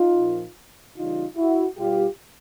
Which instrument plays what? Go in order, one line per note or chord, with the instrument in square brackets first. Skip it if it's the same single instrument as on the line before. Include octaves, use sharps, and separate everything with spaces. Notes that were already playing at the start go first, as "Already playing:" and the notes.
Already playing: [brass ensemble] D#4 F4
A#2 F3
C#3 E3 G3 D#4 F4
E4 F#4
B2 G3 F4 G4